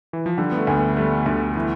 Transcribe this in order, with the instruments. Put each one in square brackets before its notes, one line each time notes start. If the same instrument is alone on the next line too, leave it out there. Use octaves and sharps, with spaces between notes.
[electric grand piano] E3
F3
[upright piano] D3 [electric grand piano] G3
[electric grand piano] B3
A3
[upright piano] D2 [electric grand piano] B3
[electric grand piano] A3
[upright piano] G3 [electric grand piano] A3
[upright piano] D2
E3